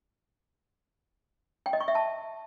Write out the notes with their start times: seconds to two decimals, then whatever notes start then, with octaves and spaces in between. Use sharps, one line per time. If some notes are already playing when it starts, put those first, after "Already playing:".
1.66 G5
1.73 D#5
1.81 C#6
1.88 E5
1.95 A5